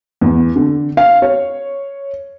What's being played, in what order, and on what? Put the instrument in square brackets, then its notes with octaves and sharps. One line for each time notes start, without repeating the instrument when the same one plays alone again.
[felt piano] E2
D3
F5
C#5